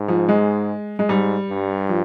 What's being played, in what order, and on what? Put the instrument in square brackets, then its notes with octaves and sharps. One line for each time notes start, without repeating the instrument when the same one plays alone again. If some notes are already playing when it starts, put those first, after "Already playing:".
Already playing: [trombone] G#2
[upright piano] F3
G#3
G#3
[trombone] G#2 [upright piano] G3
[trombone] G2
[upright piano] F3